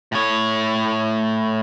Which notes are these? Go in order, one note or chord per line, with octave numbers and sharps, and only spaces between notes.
A2 C#5